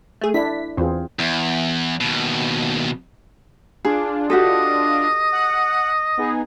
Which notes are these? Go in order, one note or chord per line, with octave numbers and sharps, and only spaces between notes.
A3 G#4
D4 E4 A4 B6
E2 C4 F4 G#4
E2
D#2 B2
D4 F4 G#4
F#4 G4 A4 D#5
F#5
B3 D#4 G#4